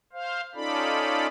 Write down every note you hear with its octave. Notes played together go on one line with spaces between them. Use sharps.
C5 F5
C#4 D#4 F4 A4 D5 B5